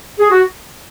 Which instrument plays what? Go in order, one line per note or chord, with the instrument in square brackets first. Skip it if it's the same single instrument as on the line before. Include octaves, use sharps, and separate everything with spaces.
[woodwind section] G#4
F#4